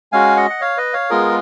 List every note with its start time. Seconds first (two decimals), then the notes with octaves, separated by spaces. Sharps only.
0.12 G#3 C#4 F#4 F5 G#5
0.37 D#5 F#5
0.50 F#5
0.61 C#5 F5
0.77 B4 D#5
0.93 C#5 F5
1.10 G#3 B3 F4 G#4 A#4